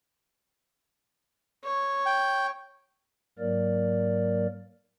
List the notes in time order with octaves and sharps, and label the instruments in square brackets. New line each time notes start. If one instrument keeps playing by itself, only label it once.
[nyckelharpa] C#5
[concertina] G5
[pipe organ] G#2 F#3 A#3 A#4 D5